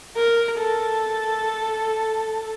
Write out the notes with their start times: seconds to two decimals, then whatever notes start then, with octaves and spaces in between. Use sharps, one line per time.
0.16 A#4
0.59 A4